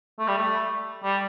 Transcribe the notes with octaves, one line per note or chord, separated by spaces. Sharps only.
A3
G3
A3
G3